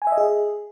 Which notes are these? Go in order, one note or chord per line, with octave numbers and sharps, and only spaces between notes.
G#5
E5
D#5
G#4